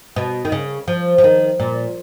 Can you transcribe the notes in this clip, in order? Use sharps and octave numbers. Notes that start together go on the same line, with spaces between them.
B2
D#3
C#3
F3
F3
D#3
A#2